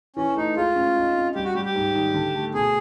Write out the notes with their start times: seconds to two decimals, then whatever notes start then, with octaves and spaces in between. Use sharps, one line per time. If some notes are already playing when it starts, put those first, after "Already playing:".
0.16 E3 C#4
0.36 A3 D#4
0.56 G#3 F4
0.75 C#4
0.96 D#4
1.15 C4
1.35 G3 G4
1.45 F#4
1.55 G3 G4
1.65 G4
1.75 G#2
1.95 D#3
2.14 D3
2.35 A3
2.54 B2 G#4